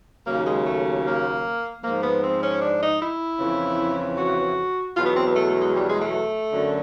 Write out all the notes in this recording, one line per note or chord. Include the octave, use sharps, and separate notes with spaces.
D#2 C#3 F#3 A#3
G#3
A3
A#3
G#2 F3 A#3
B3
C4
C#4
D4
D#4
E4
F2 C#3 E3
F#4
E2 B2 F#3 F4
B3
C4
B3
A3
A3
G#3
G3
G#3
A3
F#2 D3 F#3